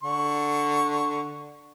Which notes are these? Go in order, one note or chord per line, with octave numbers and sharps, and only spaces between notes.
D3 C#6